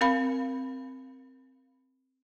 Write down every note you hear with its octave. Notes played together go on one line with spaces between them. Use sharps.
C4 A#4 F5 B5